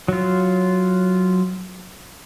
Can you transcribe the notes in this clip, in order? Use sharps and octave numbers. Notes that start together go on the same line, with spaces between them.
F#3 F4